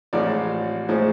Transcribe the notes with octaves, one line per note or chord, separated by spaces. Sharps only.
A1 A2 F3 G#3 C4 D5
A2 F3 G#3 C4